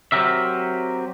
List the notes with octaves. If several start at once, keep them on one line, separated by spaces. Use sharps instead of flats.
F#3 C4 G4 A#4 E5